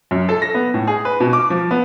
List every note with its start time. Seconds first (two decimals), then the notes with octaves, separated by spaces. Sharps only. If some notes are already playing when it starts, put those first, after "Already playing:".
0.11 F#2
0.29 A4
0.42 A#6
0.54 B3
0.74 A2
0.87 G#4
1.05 B4
1.20 B2
1.33 D6
1.50 F3
1.71 B3